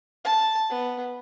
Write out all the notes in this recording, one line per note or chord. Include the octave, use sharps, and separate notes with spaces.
A5
B3